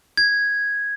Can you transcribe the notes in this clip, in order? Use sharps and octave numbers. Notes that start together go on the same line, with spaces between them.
G#6